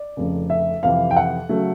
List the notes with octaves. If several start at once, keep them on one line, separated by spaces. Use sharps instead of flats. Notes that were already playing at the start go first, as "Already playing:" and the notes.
Already playing: D5
F1 F2 C#3
E5
F2 C3 E3 F5
G5
F#5
C#3 F#3 A3